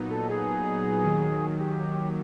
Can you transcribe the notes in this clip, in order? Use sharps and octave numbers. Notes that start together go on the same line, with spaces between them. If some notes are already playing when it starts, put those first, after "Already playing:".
Already playing: A#2 F#3 B3 D#4
A4
G#4
D#2 D#3 F#3
G4